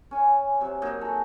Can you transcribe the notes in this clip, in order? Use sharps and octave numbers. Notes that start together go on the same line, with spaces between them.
C#4 G#5
C3 F#3
F#3 A#3 D#4
F#4 G#4 A4